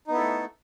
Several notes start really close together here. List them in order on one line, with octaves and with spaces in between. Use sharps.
D#4 B3 E4 A4 A3